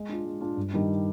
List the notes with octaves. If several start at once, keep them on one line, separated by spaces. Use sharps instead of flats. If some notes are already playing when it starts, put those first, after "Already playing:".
Already playing: G#3
D4 F4
G#3
D4 F4
G2
D#3 G3 D4